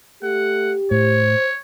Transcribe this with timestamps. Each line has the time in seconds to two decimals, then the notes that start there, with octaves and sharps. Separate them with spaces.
0.23 A3 G4 F#5
0.91 A2 C5 C#5